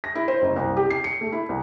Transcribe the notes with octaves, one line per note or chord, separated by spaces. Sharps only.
A#6
E4
C5
F#1
C2
G4
C7
C#7
A3
E4
C2